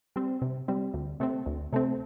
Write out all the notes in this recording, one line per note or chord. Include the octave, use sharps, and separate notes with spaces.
G3 C4
C3
G3 C4
D2
C3 A3 C4
D2
C3 A3 C4